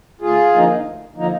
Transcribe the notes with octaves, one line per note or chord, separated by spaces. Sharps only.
D2 F4 G#4
D3 F3 A#3 D#4
D2
D3 F3 A#3 D#4